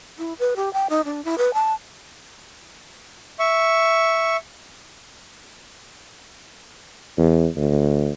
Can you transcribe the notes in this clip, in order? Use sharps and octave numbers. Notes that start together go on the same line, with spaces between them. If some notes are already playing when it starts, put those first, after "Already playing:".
E4
B4
G4
G5
D#4
D4
E4
B4
A5
E5 C#6
E2
D2